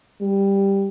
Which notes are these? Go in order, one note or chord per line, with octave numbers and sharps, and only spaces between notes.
G3